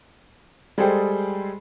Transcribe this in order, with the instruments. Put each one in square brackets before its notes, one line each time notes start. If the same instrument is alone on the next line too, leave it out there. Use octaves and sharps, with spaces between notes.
[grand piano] G3 G#3 G#4 A4 C5 G5